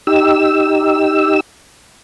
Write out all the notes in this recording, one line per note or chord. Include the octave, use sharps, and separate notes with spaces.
D#4 G4 E6